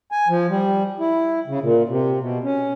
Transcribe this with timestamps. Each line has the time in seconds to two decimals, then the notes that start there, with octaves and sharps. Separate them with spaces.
0.12 G#5
0.28 F3
0.49 G3
1.00 E4
1.47 C#3
1.62 A#2
1.89 C3
2.20 B2
2.44 C#4